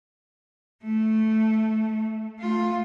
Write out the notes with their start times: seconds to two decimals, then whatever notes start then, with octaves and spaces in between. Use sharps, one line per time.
0.84 A3
2.39 A3 F4